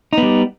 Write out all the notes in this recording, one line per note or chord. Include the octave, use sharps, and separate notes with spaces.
G3 B3 D#4